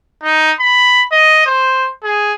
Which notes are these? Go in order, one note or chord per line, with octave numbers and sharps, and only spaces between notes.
D#4
B5
D#5
C5
G#4